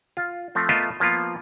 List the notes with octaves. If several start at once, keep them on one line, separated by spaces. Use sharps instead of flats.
F4
F3 A3 C4
A3 B3 F4 A#4 D#5 E5
F3 A#3 B3 F4